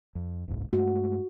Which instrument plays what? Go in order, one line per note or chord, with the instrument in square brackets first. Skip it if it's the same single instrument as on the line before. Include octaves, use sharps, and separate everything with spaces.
[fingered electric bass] F2
F#1 C2 G#2
[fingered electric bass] G2 G#3 A3 [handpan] F#4